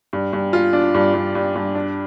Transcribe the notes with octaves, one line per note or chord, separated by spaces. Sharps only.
G2
G2
F4
D4
G2
G2
G2
G2
D4